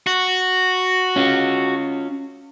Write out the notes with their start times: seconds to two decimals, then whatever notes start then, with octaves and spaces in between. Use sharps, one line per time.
0.07 F#4
1.16 C#4 F4